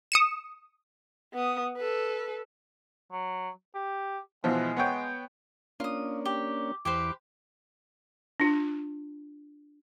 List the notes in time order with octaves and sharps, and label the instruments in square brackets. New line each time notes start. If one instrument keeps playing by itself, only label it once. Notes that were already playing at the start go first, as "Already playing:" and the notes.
[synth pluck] D#6 C#7 E7
[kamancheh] B3 D#6
A4 B4
[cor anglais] F#3
G4
[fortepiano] B2 E3 F3 [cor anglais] G#3
[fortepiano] B3 C#5 G5
[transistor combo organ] A#3 C#4 D4 [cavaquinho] F4 D#6
[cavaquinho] G4
[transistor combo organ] E2 D6 [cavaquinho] G4 B4 C5
[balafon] D4 F4